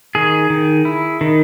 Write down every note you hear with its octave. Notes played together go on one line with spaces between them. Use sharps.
D#3 G#4
D#3
E4
D#3